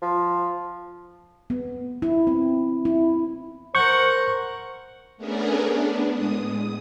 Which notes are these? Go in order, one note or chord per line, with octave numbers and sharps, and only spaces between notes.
F3
B3
E4
C4
E4
A#4 C5 F#5 C#6 G6
A3 B3 C#4 D4 G#4 A#4
B3 D4
A2 G#3 D#6
D#6